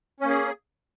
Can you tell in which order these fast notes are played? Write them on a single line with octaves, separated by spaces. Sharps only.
C#4 A#3 G#4